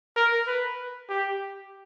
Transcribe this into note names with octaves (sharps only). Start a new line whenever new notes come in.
A#4
B4
G4